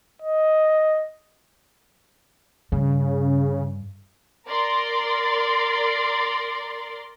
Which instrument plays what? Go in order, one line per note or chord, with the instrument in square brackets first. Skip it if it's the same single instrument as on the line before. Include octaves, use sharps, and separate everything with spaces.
[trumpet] D#5
[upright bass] G2 [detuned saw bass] C#3
[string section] A#4 D5 C6